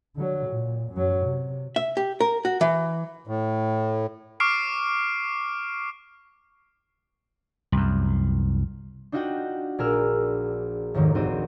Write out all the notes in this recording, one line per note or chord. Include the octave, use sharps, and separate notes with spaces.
D3 F#3
A#2
F#2 F#3
C3
E5
G4
A#4
F#4
E3
A2
C#6 D6 F6 C7 D7
C2 F#2
D4 D#4 F4 F#4 F#5 G5
A#1 G#4 A#4 E6 F6
F1 D#2 G#2 D#3
A#1 D#3 C4 F#4 D#7